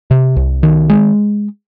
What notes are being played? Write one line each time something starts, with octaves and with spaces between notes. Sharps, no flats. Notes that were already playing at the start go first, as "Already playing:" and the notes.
C3
C2
D#3
G#3